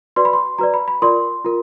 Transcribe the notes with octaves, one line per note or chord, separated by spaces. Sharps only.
F#4 B4 D5 C6
B5
C6
F#4 B4 D5 A#5
B5
B5
F4 A#4 D5 C6
F4 A#4